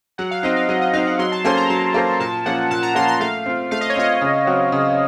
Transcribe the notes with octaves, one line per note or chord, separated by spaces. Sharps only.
F#3 F#5
F5
C4 D#4 D#5
F5
F#3 D#5
D#5
C4 D#4 F5
F#5
F#3 C6
A5
A#3 C#4 A4 C5 C6
A#5
F#3 A5
A#3 C#4 A4 C5
A#2 A5
F3 A#3 C#4 F#5
A#2 A5
A#5
F3 A#3 C#4 C6
C6
A3 F5
C4 F4
A3 F5
D#5
C#5
C4 F4 D#5
C#3
F#3 C4 F#4
C#3